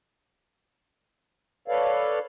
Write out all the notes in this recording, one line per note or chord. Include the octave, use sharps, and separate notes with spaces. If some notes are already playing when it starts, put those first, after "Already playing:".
A4 B4 C#5 D5 F5